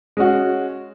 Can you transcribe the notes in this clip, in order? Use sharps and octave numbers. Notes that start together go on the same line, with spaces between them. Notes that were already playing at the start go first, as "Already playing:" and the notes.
G#3 C#4 F#4